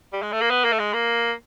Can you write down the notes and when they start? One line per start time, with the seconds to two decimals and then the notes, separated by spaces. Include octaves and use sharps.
0.13 G3
0.22 G#3
0.32 A3
0.41 A#3
0.50 B3
0.64 A#3
0.72 A3
0.79 G#3
0.93 A#3